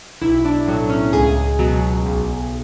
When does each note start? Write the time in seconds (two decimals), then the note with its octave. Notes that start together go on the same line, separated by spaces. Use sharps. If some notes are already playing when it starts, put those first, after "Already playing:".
0.21 B1 E4
0.45 D4
0.68 A2 F#3
0.90 C#4
1.13 C#2 G#4
1.59 B2 F#3
2.05 B1